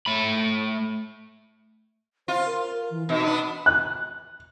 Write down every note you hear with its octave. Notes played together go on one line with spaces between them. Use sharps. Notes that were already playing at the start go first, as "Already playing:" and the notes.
A3 B5
F4 C5
A#4
E3
B2 D#4
B3 D4
F#6